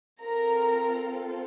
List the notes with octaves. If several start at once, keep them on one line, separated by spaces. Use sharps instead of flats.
C4 F4 A4 A#4 A#5